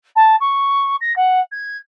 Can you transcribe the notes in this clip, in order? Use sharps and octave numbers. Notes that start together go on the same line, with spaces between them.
A5
C#6
A#6
F#5
G#6